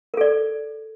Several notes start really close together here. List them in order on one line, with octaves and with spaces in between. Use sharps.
A#4 A4 D5